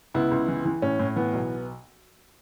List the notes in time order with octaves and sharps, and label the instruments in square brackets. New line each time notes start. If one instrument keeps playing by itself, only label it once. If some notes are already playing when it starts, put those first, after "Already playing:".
[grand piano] C#2 B3 E4
C#2
E3
E3
A2 C#4
A2
E3 B3
B1